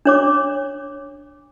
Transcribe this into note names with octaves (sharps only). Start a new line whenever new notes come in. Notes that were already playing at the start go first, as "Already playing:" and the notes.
D4 C#5 D6